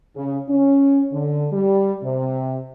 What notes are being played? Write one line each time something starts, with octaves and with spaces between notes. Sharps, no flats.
C#3
C#4
D3
G3
C3